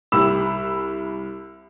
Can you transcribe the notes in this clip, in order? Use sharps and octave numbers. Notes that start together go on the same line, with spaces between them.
C2 B5 E6